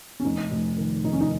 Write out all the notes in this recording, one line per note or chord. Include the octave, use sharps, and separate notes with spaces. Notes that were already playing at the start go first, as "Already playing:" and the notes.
C#4
F1 D#4
F1
D#3
F1 D#4
C#4
D#4